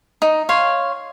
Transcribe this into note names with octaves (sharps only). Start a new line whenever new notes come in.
D#4
C#5 F5 C6